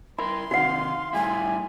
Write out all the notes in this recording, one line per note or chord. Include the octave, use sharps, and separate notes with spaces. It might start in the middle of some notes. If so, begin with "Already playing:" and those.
E4 A#4 B5 C6
C3 D#3 F#4 F5 F#5
A2 G3 E4 G#5